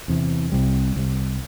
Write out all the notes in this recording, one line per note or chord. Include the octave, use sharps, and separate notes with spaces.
E2 C3 E3
C2 C3 G3
C2 C3 G3